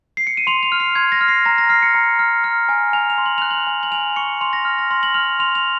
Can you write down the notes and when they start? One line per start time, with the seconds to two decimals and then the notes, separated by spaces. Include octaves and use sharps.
0.17 C7
0.27 C#7
0.37 D#7
0.47 C6 F7
0.63 F7
0.72 F6
0.80 C7
0.95 C6 G#6
1.12 A#6
1.21 F6
1.28 C7
1.45 A#5 A#6
1.58 A#6
1.69 F6 C7
1.82 C#7
1.95 A#5
2.19 F6
2.44 F6
2.69 G#5
2.93 G#5 F7
3.10 F7
3.18 C6
3.26 F#7
3.38 F#6 F7
3.51 F#7
3.67 G#5
3.83 F#7
3.91 G#5 F7
4.16 C#6 C#7
4.41 C6 F7
4.53 A#6
4.65 F6
4.78 A#6
4.91 C6 A#6
5.03 F#7
5.14 F6 F7
5.39 C6 F7
5.55 F7